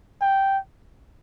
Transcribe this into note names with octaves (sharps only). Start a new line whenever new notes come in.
G5